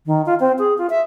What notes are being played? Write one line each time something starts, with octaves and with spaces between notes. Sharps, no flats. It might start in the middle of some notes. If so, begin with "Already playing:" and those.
D#3
F4
C4
G#4
F4
E5